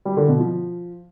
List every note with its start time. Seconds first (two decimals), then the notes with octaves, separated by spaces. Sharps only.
0.05 G3
0.17 D3
0.28 B2
0.40 F3